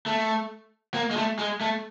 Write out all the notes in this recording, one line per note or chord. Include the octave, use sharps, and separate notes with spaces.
A3
A#3
G#3
A3
G#3
A3